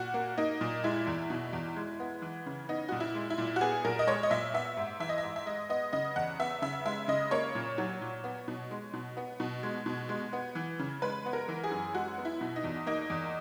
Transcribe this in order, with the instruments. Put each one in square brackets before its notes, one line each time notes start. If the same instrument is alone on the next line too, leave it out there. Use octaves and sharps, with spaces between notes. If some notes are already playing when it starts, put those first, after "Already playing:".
Already playing: [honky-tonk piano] A#2 F#4
A#3
A#3 D#4
A#2
G#3 E4
E2
B2
E2
G#3
B3
E3
C#3
B3 D#4
A#2 F#4
E4
G#3
E4
A#2
F#4
B3 G#4
A#2 A#4
D#5
G#3 C#5
D#5
A#2 E5
B3 E5
G#2
E3 E5
D#5
E5
G#2
E5
G#3 D#5
B3 D#5
C#3 D#5
E2 F#5
B3 E5
C#3 E5
G#3 E5
C#3 D#5
A#3 C#5
A#2
F#3
A#2
B3
B2
G#3
B2
B3
B2
G#3
B2
G#3
B3
E3
C#3
G#3 B4
B3
A#4
E3
G#4
F#2
G#3 F#4
B3
E4
B2
D#4
E2
A#3 D#4
E2